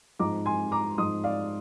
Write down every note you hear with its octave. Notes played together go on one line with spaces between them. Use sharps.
G#2 F3 A#5 D6
G#5 C6
A#5 D6
G#2 F3 C6 D#6
D5 F5